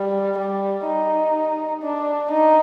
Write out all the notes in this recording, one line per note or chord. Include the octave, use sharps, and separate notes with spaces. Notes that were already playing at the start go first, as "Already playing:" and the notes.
Already playing: G3
G3
D#4
D4
D#4